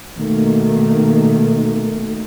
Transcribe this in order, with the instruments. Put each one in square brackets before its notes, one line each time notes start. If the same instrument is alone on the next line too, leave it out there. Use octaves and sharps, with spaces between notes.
[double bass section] B2 D#3 A3 A#3